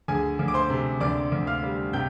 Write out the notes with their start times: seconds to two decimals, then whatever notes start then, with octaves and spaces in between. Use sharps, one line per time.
0.08 D2 G#4 G#5
0.39 D2
0.48 D6
0.54 C5 C6
0.70 C3
1.00 D2 D5 D6
1.32 D2
1.47 F5 F6
1.63 G3
1.93 C3 G5 G6